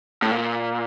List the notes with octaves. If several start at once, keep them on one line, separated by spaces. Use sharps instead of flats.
A2
A#2